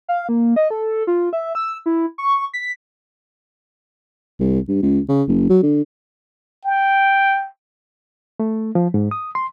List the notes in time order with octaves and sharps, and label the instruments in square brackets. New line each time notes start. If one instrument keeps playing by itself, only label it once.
[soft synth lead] F5
A#3
D#5
A4
F4
E5
E6
E4
C#6
B6
[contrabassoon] C2
G2
C#2
C#3
F#1
F#3
D3
[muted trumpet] G5
[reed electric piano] A3
F3
G#2
D#6
C6